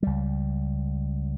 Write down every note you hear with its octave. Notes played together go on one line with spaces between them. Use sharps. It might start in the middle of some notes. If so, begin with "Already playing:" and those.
C#2 G3